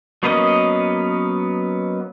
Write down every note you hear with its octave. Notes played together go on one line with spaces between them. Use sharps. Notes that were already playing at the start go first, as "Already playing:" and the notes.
F#3 A#3 B3 C#4 D#5